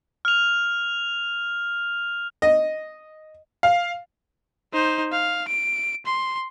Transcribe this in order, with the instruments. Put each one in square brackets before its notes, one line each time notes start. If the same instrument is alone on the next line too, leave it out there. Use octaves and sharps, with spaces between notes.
[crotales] F6 F7
[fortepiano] D#5
[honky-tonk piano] F5
[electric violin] D#4 C5
F5
D7
C6